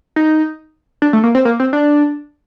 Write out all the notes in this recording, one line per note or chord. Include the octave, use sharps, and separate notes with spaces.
D#4
D4
A3
A#3
C4
A#3
C4
D4